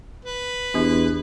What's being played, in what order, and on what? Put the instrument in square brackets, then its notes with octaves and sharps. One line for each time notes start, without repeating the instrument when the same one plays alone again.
[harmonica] B4
[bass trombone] E2 [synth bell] B3 D4 G4